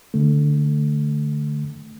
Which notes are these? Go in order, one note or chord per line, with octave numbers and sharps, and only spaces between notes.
D3 A3